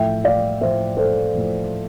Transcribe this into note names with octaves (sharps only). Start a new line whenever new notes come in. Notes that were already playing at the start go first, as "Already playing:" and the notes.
Already playing: A2 F3 E5 G5
D5 F5
A2 F3 C5 E5
A4 C5
A2 F3